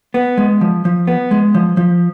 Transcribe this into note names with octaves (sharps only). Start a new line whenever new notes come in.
B3
G#3
F3
F3
B3
G#3
F3
F3